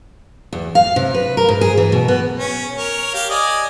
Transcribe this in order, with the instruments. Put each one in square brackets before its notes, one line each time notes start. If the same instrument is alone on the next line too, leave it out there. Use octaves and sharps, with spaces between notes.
[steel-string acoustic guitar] E2
F5
C3
B4
A#4
G#2
G#4
E3
B2
B3
[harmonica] C#4
A#4 C#5
G4 F5
D5 D#5 G#5